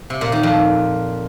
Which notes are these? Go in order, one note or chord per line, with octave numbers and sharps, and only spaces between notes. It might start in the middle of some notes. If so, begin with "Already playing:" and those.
C3
A#2
D#3
F2